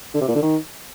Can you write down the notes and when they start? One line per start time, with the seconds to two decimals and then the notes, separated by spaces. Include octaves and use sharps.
0.14 D3
0.21 C3
0.28 A#2
0.35 D3
0.42 D#3